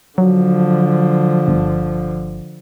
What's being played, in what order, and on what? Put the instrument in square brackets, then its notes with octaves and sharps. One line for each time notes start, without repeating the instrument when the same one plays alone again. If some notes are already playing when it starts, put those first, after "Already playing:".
[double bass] D3 F3 [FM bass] F#3
[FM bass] G1